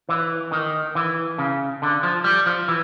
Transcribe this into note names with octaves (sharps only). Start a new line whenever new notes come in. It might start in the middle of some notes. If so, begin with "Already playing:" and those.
E3
D#3
E3
C#3
D3
F3
G3
F3
E3